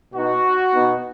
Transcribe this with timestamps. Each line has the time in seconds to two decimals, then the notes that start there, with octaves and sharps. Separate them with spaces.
0.14 B2 B3 D#4 F#4
0.74 B2 B3 D#4